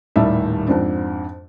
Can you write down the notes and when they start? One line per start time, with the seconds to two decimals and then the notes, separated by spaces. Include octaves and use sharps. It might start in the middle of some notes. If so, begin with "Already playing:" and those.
0.16 D#1 A2 D#3 G3 E5 A5
0.68 F2 G#2 C4 D4